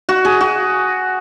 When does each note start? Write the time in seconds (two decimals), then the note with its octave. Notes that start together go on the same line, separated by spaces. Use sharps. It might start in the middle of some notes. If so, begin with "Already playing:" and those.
0.09 F#4
0.25 G#4
0.41 F#4